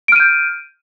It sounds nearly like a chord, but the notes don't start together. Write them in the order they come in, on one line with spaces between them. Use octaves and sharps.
D7 F6 D#7 G6